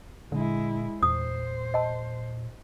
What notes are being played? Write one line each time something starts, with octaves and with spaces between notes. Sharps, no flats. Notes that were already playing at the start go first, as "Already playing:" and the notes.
A#2 D3 G#3 E4
E2 A#2 C5 D#6
D#5 A5